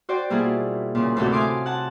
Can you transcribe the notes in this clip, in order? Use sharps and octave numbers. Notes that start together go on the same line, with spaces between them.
F#4 C5 D5 G5
B2 G3 A#3 E4 F4 G#4
A#2 C#3
D2 A2 C3 E3 F#4 A4
F5 G#5 C6 D6 D#6
F#5 A5